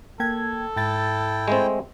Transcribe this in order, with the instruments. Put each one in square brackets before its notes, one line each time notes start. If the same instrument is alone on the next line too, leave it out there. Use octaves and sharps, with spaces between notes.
[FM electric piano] A#3 G5 G#6 [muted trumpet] A4
[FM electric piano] G#2 A6 [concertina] E4 G5
[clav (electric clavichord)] G#3 A3 C4